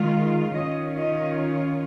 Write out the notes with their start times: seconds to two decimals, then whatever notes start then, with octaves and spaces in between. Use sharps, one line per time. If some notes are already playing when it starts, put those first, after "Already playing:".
Already playing: D#3 G#3 F4
0.54 D#3 C#4 F4 D#5
0.96 D#5